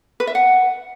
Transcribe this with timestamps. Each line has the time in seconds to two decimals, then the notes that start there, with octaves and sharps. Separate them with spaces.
0.20 B4
0.27 E5
0.35 F#5